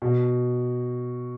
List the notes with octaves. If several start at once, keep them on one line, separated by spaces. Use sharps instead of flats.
B2